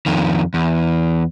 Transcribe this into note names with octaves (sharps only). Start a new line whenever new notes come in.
F2 D#3
E2